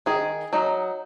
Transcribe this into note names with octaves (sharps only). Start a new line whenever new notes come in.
D#3 G#4
F#3 D#4